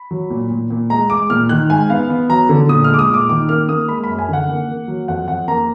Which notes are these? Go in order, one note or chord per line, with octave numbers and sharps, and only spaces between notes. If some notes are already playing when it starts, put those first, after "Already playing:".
Already playing: B5
F#3
A#2
A#2
A#2
G#3 A#5
G#3 D6
A#2 F6
D#3 F#6
G#2 G#5
B3 F5
B3
F#3 A#5
D3
A#2 D#6
G#3 F6
D6
D#6
A#2
D6
D#3 D6
A#3 F6
A#3 D#6
G#3 B5
B5
F#2
G#5
D3 F#5
A#3
A#3
F#3
F2 F#5
F2 F#5
A#3 A#5